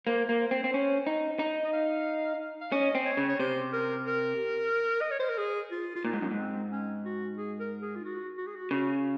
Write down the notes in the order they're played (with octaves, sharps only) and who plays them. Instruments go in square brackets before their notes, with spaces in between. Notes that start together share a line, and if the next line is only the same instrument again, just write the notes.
[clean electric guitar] A#3 [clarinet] C5
[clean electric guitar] A#3
[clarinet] C5
[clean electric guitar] C4
C4
C#4
D#4
D#4
[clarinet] D#5
F5
F5
[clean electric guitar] C#4 [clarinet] D#5
[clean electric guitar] C4
[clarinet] C#5
[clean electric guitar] C#3
[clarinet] C#5
[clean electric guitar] C3 [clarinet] C5
[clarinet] A#4
A#4
D#5
C#5
C5
A#4
G#4
F4
F4
[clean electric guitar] A#2 [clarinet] D#4
[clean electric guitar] G#2
F#2
G#2
[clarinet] C4
C#4
F#4
G#4
A#4
G#4
F4
F#4
F#4
G#4
F#4
[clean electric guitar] C#3 [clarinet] F#4